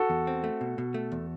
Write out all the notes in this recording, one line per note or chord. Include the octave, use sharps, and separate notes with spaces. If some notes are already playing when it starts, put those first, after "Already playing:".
Already playing: F#4 A4
E2
C4
A3
B2
B2
A3
E2